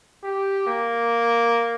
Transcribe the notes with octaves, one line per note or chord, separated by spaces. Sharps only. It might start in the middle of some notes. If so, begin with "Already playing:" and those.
G4
A#3